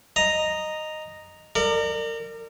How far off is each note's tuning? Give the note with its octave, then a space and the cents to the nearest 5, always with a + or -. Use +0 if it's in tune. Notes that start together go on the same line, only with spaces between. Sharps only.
D#5 -5 A#5 +0
A#4 -30 D5 +30